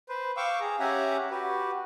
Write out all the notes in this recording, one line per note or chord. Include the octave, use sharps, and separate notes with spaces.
B4 C5
F5 G5 C#6 D6 E6
G#4 A#5
C#4 G4 E5 F#5 G#5 A#5
F#4 G4 B4